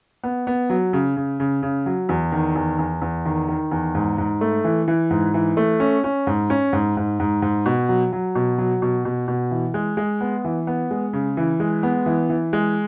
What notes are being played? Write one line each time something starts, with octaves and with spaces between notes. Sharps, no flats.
B3
B3
F#3
C#3
C#3
C#3
C#3
F#3
E2
D#3
E2
E2
E2
D#3
D#3
E2
G#2
G#2
A3
E3
E3
G#2
E3
A3
C#4
C#4
G#2
C#4
G#2
G#2
G#2
G#2
B2
F#3
F#3
B2
F#3
B2
B2
B2
E3
G#3
G#3
B3
E3
B3
G#3
C#3
E3
G#3
B3
E3
E3
G#3